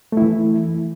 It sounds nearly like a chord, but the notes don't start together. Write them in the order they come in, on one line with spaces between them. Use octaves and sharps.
A3 E4 E3